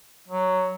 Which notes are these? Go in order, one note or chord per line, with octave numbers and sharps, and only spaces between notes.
F#3